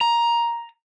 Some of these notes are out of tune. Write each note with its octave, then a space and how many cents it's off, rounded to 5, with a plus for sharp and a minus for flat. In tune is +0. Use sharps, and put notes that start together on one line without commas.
A#5 +10